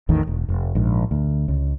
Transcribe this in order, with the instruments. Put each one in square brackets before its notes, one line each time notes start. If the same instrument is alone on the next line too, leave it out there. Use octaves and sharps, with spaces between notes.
[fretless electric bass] A1 E2 A2 D#3
E1
F1
A#1 G#2
D2
C#2